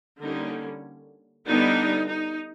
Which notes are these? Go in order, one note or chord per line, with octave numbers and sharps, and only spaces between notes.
D3 G3 A#3 C#4 D#4
D3 G3 B3 D4 D#4
D#4